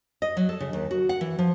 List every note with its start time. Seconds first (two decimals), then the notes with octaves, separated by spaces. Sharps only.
0.22 D#5
0.37 F#3
0.49 A4
0.60 C#3
0.73 D#2
0.91 F#4
1.09 F#5
1.21 E3
1.39 F3